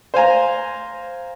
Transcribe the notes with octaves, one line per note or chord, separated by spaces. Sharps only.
C5 F5 G#5 A#5